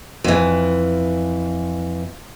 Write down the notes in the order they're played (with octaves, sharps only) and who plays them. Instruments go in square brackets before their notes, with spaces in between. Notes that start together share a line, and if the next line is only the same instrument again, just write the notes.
[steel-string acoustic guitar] F2 E3